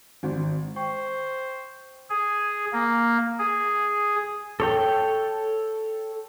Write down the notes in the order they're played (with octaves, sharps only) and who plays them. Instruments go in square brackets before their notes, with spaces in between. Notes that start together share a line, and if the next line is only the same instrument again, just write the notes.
[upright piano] G#1
[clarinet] C5 [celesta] G5 C#6
[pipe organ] G#4
A#3
G#4
[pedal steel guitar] A4 C#5 G5